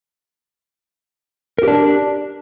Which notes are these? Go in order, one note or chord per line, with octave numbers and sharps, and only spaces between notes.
D4 G4 A#4